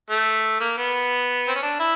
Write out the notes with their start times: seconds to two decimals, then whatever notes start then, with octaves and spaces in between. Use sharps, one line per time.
0.10 A3
0.61 A#3
0.78 B3
1.48 C4
1.55 C#4
1.63 D4
1.80 E4